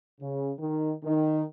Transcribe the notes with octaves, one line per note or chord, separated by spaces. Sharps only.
C#3
D#3
D#3